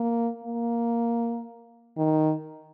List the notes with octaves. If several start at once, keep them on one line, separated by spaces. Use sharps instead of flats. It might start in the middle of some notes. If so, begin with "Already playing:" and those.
Already playing: A#3
A#3
D#3